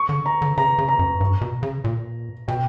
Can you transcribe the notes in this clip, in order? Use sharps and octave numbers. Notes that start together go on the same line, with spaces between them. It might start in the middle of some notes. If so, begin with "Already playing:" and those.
Already playing: C#6
D3
A#5
D3
C#3 A#5
C#3
A#5
F#2
G2
B2
C#3
A#2
B2 G5